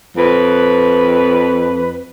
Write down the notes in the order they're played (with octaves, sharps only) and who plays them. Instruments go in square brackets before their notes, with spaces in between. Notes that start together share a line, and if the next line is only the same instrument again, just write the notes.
[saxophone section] F2 B4